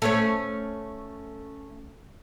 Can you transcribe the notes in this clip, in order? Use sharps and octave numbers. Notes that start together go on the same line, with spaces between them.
A3 C#4 C#5